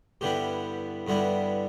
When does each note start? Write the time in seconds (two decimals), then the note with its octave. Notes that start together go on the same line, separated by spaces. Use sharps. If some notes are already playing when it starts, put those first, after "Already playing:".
0.21 G2 D3 G3 B3 E4 G4
1.07 G2 D3 G3 B3 E4